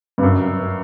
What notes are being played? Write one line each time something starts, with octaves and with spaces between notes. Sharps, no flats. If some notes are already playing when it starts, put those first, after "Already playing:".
G2
F#2